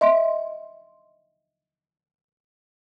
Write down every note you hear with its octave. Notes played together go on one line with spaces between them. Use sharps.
D#5 E5 C6